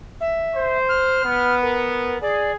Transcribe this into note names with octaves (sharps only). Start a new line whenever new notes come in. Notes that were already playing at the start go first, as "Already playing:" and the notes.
E5
C5
F6
B3
A#4
G#4 D5